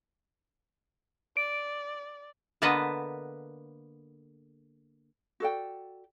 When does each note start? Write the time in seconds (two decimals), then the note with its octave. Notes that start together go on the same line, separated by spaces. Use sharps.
1.37 D5 D7
2.62 D3 A#3 B3 B4 D#5 A5
5.40 F#4 A4 D5 G5